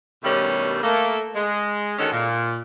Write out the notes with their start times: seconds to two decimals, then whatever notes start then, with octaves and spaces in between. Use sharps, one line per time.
0.23 G2 B2 D#3 G3 A3 C#4
0.83 A3 A#3 A4
1.35 G#3
1.98 D3 D#3 G#3 C#4 F#4 A4
2.12 A#2